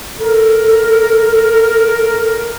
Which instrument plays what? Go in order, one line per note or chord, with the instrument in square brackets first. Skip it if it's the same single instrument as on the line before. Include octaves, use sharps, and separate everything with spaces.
[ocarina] A4 [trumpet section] A#4